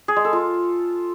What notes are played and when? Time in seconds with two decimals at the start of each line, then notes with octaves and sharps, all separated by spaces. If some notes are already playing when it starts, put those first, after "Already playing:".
0.08 G#4
0.16 G#3
0.25 A4
0.33 F4